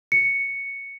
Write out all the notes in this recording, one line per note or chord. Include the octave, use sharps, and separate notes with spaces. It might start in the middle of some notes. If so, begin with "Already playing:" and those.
C#7